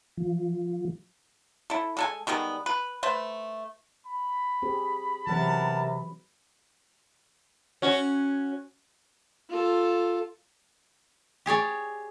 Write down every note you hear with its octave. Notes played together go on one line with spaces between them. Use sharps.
F3
E4 A4
G#3 A4 G#5
D#3 G3 G#3 B3
B4
A3 B4 C5
B5
C4 G4 G#4
C3 E3 F#3 C4 A#4 F#5 A5
C#4 F#4
F4 A4
G4 G#4 C#5 D5